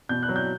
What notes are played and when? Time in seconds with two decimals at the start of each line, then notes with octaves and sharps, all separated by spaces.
0.09 B2 G6
0.23 F#6
0.29 F#3
0.36 G6